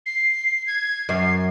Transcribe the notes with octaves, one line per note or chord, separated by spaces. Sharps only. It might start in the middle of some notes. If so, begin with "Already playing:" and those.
C7
G#6
F#2 C7